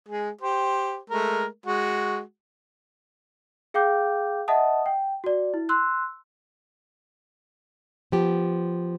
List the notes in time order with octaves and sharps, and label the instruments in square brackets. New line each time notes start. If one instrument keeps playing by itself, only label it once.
[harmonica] G#3 G#4
G4 C5
G#3 A3 A#4
G#3 F#4
[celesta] G#4 F5 G5 D6 G6
D#5 E5 F#5 A5 D#6
G5
F#4 D5
E4
C6 E6 F#6
[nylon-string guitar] F3 B3 G4